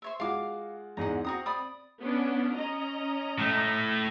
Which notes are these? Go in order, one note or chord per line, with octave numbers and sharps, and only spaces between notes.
C5 C#5 E5
G#3 F4 F#4 F5 D6
E2 G#2 G#3 F#5 A#5
C4 F#4 A#5 D#6
D5 B5 D#6
B3 C#4 D4
C#4 D#5 A#5
A2 A3